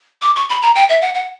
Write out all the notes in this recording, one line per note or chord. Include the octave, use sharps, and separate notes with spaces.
D6
C#6
B5
A#5
G5
E5
F#5
F#5